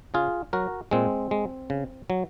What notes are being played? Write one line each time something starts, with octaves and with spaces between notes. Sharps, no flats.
C#3 F4 G#4
F#3 F#4 A#4
A#2 G#3 C4
G#3
C#3
F#3